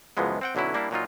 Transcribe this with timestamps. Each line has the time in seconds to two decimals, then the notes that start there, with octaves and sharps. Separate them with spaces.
0.17 C#2 F#2 E3 F3 G#3 B3
0.41 C4 F#5 G5
0.55 B1 D3 F#3 C#4 E4
0.74 G3 A#3 D4 E4
0.91 A#2 F#3 D#4 F4